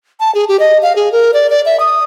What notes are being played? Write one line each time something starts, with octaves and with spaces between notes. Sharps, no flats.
A5
G#4
G4
D#5
F5
G#4
A#4
D5
D5
E5
D#6